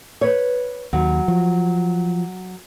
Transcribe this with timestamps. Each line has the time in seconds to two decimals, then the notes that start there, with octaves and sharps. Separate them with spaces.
0.21 B4 C#5
0.93 D#2 F#3
1.28 F3